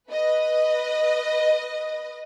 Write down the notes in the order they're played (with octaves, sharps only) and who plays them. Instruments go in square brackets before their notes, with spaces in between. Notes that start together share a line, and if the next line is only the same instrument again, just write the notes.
[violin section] B4 D#5